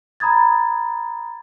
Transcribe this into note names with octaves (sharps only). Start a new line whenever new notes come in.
A#5 B5 D#6 G#6 A6